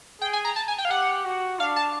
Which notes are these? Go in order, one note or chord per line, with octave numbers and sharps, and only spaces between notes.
G#4 G5
G#5
A#5
A5
G#5
G5
F5
G4 F#5
F#4
D4 F5
A5